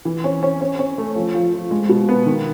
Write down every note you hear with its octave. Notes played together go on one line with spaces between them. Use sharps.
E3
C#4
C#4
C#4
C#4
A3
F3
F3
F3
G#3
B2
B3
D#3